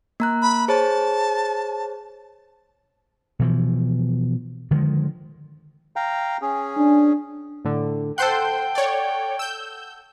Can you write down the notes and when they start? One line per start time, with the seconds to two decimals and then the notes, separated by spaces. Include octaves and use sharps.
0.20 A#3 A#5 F#6
0.42 B5
0.68 G#4 C5 C#5 A5
3.39 B2 E3 F3
4.71 D3 D#3 F3 G#3
5.96 F5 G5 A#5
6.42 C#4 G#4
6.77 D4
7.65 A2 D3
8.18 A4 C5 F#5 G5 C6 G6
8.75 C#5 D5
9.39 E6 G6